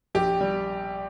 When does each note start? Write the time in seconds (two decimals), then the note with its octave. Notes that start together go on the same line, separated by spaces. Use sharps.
0.15 A#1 G4
0.41 G3